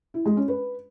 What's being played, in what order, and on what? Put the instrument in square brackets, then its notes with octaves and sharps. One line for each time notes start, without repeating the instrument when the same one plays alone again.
[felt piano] E4
G#3
C#4
B4